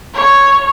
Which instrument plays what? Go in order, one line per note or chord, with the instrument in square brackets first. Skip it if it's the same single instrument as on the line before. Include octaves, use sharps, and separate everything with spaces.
[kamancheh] C#5